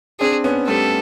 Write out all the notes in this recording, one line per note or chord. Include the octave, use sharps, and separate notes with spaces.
C4 D4 G#4
B3 C#4
G3 A3 A4